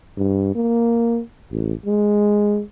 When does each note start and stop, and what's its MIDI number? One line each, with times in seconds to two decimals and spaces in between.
0.18 0.53 43
0.55 1.20 58
1.51 1.73 33
1.86 2.62 56